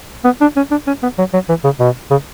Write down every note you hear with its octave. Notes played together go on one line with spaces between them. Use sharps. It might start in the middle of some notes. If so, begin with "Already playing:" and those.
B3
D4
C#4
D4
C#4
B3
F#3
F#3
E3
C#3
B2
C#3